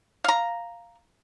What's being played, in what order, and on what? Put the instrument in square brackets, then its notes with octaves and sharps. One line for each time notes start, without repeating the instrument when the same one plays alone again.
[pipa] F5 A#5